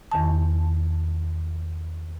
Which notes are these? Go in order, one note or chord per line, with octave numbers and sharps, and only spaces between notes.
E2 D#3 A5